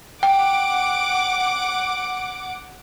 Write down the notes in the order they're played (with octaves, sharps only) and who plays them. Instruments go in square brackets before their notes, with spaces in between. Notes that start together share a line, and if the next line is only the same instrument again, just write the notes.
[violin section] F#5 D6 [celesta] G5